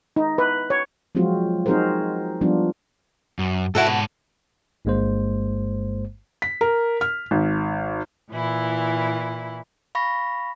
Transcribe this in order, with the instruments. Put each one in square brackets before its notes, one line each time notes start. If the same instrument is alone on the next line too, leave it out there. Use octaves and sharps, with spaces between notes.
[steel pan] D#4
B4
C#5
[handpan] F3 F#3 G#3 C4 F4 F#4
C4 D#4 F#4 G#4 A#4 C5
F3 G3 B3 D4 F4
[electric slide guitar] F#2
[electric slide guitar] G#2 A5 [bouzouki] E4 F#4 A4
[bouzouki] B2
[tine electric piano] G1 G2 G#3 A#3 C5
[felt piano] B6
A#4
F6
G#1
[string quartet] A#2 E3 E4
[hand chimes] F5 B5 C#6 A#6